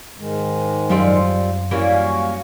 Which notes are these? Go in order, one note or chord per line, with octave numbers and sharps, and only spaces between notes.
G#2 D#3 G#3
F#2 F3 G3 C4
E3 G3 A#3 C#4 F#4 C#5